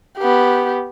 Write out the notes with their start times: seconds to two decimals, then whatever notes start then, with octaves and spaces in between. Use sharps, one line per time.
0.18 B3 G4